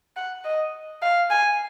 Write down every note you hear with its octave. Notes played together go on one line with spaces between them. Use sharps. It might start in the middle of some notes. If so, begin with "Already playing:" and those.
F#5
D#5
F5
G#5